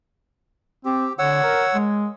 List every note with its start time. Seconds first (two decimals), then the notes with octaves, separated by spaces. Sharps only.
0.85 C4 G4
1.19 D3 C#5 F#5 E6
1.43 A#4
1.74 G#3